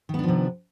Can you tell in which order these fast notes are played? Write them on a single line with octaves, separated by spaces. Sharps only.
D#3 B3 D4 F3 C3